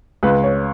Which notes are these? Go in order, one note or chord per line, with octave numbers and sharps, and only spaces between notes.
C#2 B4
C#5